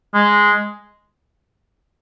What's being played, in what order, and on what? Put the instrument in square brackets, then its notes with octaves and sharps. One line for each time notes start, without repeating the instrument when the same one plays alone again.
[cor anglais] G#3